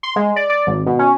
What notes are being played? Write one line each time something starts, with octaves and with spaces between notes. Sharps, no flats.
C6
G#3
D5
D5
G#1
B2
C#4